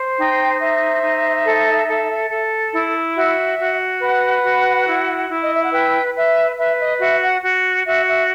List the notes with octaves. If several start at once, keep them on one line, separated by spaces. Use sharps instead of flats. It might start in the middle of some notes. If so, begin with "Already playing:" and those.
Already playing: C5
D#4 G5
C5 E5
D#4
A4
A4
A4
E4
F#4 E5
F#4
B4 F#5
F#4
E4
E4
D#5
E5
F#5
B4 G5
B4 E5
B4 E5
D#5
F#4 E5
F#5
F#4
F#4 E5
E5